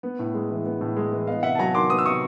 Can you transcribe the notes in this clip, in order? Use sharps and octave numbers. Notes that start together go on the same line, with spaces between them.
B3
A2
G#3
E3
B3
A2
G#3
E3
B3 D#5 F5
C3 E5 F#5
A5
F#3 G#5 A#5
D#3 C6 D6
B3 D#6
E6
C3 C#6 D#6